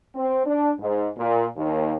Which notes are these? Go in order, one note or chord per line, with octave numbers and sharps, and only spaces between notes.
C4
D4
G#2
A#2
D#2